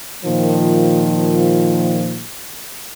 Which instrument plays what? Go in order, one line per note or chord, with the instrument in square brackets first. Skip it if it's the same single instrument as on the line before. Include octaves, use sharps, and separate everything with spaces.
[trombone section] A#2 D#3 F3